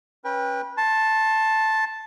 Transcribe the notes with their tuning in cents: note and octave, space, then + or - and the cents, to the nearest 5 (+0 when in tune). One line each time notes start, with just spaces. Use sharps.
C#4 -5 B4 -25 G5 +20
A5 +0 C6 +30